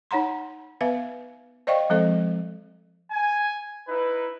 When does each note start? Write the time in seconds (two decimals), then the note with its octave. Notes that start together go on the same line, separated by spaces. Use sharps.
0.11 D#4 C#5 F#5 A#5 C6
0.81 B3 B4 E5 F5
1.67 C5 D5 D#5 F5 G5 C#6
1.90 F3 G#3 C4 A4 C5 D#5
3.11 G#5
3.88 D#4 E4 B4